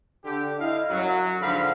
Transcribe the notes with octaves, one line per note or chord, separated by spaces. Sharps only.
D3 G4
E4 D#5 F5
F#2 F#3
G#2 D3 F3 F5 B5